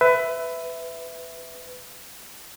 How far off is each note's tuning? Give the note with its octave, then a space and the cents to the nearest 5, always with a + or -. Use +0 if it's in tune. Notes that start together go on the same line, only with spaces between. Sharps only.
B4 +20 E5 +0